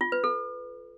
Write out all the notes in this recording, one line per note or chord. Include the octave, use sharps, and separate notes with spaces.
F4
B4
A4